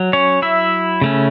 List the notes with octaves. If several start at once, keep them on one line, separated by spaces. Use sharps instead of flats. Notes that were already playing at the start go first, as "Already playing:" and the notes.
Already playing: F#3
C#4 C#5
E4 E5
C#3 A3 C#4